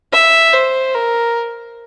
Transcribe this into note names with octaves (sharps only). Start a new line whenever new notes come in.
E5
C5
A#4